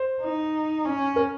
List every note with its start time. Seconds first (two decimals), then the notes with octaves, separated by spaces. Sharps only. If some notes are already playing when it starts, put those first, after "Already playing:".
Already playing: C5
0.22 D#4
0.85 C#4
1.16 A#4